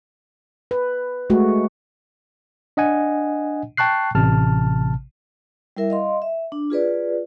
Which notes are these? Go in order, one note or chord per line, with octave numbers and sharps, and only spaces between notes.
B4
G#3 A3 F#4
D4 D#5 F#5 G#5
G5 A5 C#6 F#6 C7
A1 C3 A5 F6
G3 E4 A#4 E5
D#5 F5 C6
E5
D4
F4 G#4 B4 D5